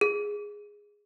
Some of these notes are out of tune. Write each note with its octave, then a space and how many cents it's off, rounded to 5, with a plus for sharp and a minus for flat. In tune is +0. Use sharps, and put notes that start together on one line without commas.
G#4 -5